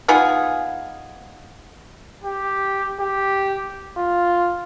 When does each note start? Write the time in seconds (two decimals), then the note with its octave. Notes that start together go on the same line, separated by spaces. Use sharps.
0.08 B3 D#4 F4 G#4
2.24 G4
3.00 G4
3.97 F4